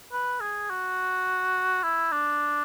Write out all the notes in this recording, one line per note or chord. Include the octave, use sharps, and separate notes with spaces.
B4
G#4
F#4
E4
D4